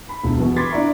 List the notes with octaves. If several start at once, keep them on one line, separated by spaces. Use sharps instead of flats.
B5
E1
B2 E3 B3 F#4
B5 C6 D6 G#6 A6 B6
D4 E4 D5 E5 A#5 C#6